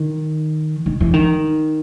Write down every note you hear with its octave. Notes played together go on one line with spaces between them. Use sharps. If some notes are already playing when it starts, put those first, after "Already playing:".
Already playing: D#3
D#3
E3
D#3